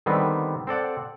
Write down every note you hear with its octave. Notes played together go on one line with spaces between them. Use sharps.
D3 D#3 G3 B3 C4
C4 A4 D5 F#5